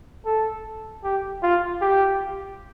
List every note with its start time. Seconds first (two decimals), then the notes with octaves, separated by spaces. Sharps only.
0.25 A4
1.04 G4
1.43 F4
1.81 G4